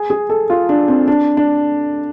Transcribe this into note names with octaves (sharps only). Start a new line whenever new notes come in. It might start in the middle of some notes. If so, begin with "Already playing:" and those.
Already playing: G#4
G#4
A4
F4
D4
C4
D4
D4